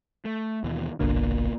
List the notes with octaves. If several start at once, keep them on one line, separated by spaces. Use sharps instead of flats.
A3
D#2 B2 E3
G1 C2 B2 D3 A#3